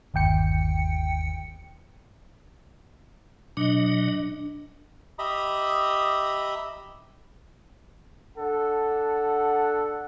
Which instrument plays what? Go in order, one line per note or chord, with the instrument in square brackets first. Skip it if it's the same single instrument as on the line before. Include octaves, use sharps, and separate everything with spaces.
[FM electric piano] G1 D#2 G5 C#7
[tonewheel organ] B2 F#3 D#5 [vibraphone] D4
[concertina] G4 D#5 E5 A#5 B5 D#6
[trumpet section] D4 A4 F#5